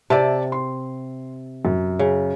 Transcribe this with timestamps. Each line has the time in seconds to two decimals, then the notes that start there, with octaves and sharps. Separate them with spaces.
0.10 C3 D5 E5 A5
0.52 C6
1.65 F#2
1.99 C#3